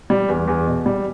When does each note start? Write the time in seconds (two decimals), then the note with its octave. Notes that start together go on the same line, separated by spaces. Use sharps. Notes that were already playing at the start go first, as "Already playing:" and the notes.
0.10 G3
0.29 E2
0.47 E2
0.67 B2
0.86 G3